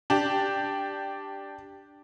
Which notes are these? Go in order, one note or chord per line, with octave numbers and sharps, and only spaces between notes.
D4 G4